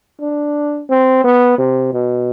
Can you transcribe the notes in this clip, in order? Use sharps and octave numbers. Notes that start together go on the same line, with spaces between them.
D4
C4
B3
C3
B2